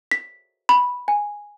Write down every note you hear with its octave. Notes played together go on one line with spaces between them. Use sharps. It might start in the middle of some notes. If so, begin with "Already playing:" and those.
B6
B5
G#5